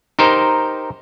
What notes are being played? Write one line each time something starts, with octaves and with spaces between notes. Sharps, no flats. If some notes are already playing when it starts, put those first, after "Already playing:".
D#4 G4 A#4 C5